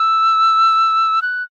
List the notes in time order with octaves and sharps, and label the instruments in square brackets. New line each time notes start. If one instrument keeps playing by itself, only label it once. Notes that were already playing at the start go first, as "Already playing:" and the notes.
Already playing: [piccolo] E6
F#6